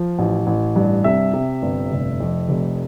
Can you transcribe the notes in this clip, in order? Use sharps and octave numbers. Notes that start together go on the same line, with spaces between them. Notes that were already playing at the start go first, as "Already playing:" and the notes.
Already playing: F3
A1
A1
G2
C3 E5
C3
G1
F1
F2
F1